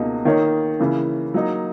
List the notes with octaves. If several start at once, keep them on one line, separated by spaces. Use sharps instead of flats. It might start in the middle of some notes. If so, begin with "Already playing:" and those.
Already playing: C#2 B2 A#3 D#4
D#3 A#3 D#4 A#4 C#5
C#3 E3 A#3 C#4
F#3 A#3 D#4